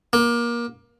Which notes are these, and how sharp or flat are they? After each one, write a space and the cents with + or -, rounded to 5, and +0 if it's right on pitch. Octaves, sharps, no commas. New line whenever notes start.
A#3 +25